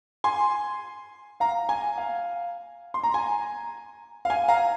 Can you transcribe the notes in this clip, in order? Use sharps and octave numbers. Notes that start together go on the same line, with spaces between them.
G#5 C6
F5 A#5
G#5
F5
C6
A#5
G#5
F5
G#5
F5 A#5